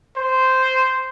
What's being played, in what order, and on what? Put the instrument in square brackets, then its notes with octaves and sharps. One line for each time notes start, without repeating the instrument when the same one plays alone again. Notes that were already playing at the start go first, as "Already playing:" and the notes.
[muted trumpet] C5